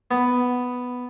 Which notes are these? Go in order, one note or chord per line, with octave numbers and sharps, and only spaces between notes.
B3